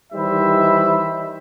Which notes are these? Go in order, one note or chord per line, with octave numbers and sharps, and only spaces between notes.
D#3 E3 G3 C5 E5 B5